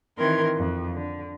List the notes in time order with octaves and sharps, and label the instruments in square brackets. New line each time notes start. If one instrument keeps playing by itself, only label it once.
[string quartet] D#3 E3 C4 A#4 C6 G#6
F2
D3